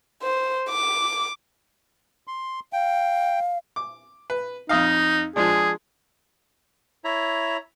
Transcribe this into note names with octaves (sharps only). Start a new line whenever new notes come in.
C5
D6
C6
F5 G5
D6
B4
F2 D#4 D#5 F5
F3 G#3 D4 G#4
E4 C#5 E5 A#5